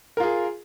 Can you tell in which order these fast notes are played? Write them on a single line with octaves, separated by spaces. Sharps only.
A#4 F4 G#4